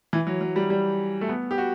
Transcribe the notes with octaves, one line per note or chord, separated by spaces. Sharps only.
E3
F#3
F#3
G3
G3
A3
B3
G4
F#4